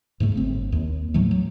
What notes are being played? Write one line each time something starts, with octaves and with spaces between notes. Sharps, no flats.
G#2 C#3 A3
G1 C4
D#2
A2 E3 F#3 A3
F#3